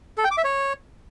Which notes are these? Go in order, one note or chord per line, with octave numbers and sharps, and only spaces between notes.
A4
G5
D6
E5
C#5